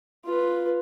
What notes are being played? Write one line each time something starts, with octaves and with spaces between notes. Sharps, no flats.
F4 B4